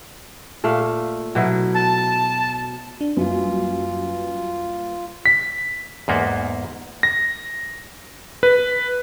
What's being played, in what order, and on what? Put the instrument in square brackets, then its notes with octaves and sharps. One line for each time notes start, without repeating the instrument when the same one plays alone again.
[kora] A#2 A3 F5
B2 F#3 E4
[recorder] A5
[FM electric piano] D4
[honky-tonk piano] F#2 [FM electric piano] G3 A#3 B4 [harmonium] F4
[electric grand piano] B6
[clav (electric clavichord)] E2 G#2 A#3 B3
[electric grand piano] A#6
B4